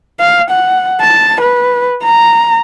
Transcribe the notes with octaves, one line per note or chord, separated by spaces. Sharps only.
F5
F#5
A5
B4
A#5